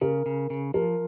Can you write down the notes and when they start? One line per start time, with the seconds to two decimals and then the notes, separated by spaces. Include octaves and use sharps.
0.01 C#3 A#4
0.26 C#3
0.50 C#3
0.74 F3 A#4